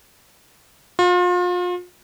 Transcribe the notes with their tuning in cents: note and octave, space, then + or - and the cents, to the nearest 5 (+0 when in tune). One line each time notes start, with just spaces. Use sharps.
F4 +35